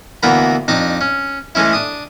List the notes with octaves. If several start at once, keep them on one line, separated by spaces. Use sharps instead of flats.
D2 E3 A#3 B3 A#5 B5
F2 D4 D#4 D6
C#4
E3 G#3 A3 C#4 E4
D4 D#6